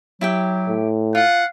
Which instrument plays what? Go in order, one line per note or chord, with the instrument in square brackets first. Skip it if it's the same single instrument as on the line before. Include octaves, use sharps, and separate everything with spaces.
[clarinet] F#3 [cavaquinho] E4 G4 G5
[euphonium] A2
[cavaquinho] F4 [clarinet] F5 [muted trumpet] F#5